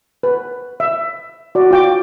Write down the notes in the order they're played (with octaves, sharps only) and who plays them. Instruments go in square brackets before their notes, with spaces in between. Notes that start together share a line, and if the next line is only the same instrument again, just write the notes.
[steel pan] B4
E5
F#4 D5
F4 G5 D6